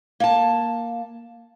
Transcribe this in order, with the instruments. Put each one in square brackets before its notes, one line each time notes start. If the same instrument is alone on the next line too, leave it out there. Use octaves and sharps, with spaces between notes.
[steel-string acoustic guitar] A#3 A5